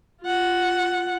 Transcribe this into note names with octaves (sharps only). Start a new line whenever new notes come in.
F4 F#5